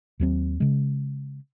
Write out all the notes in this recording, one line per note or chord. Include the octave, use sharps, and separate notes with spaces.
D#2 F#3 C4
C#3 G#3